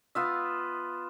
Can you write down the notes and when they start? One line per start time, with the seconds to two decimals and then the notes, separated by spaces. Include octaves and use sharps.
0.15 B3 F4 E5